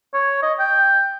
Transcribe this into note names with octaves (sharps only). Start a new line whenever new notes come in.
C#5
D#5
G5